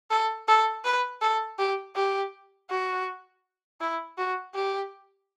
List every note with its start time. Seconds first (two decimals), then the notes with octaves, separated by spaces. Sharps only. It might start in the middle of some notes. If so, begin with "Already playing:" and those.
0.10 A4
0.48 A4
0.84 B4
1.21 A4
1.59 G4
1.95 G4
2.70 F#4
3.81 E4
4.18 F#4
4.54 G4